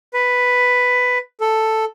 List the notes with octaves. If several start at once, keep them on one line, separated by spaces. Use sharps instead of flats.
B4
A4